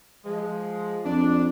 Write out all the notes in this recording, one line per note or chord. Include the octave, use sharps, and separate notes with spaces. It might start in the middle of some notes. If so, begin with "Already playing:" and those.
F3 G#3
F2 D4